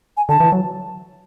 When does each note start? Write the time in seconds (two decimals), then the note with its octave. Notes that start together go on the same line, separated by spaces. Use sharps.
0.17 G#5
0.29 D3 A5
0.40 E3
0.52 F#3